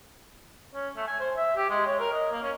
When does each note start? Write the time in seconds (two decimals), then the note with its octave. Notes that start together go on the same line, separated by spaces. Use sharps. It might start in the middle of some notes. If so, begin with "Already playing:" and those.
0.74 C#4
0.96 A3
1.07 G#5
1.19 C5
1.37 E5
1.57 G4
1.70 G#3
1.87 C#5
2.00 A#4
2.12 D#5
2.31 A#3
2.43 C#4